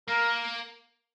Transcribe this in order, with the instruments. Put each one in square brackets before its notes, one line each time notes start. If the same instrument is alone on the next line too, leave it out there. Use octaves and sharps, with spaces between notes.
[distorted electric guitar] A#3 [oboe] A#4